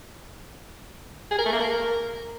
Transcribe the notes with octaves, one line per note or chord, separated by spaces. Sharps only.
G#4
A#4
A3
A#3
A#4